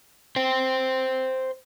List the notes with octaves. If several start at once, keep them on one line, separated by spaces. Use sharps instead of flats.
C5 G5